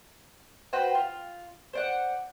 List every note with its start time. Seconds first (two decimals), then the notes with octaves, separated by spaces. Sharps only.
0.73 F#4 B4 C5 G5
0.95 F4
1.73 C5 D5 F#5